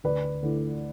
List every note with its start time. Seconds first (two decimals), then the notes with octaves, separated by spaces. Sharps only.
0.04 D2 B4 D5
0.42 D3 A3 E4